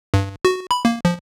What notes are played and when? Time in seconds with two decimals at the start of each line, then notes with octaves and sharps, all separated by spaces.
0.14 G2
0.45 F#4
0.71 B5
0.85 A#3
1.05 F3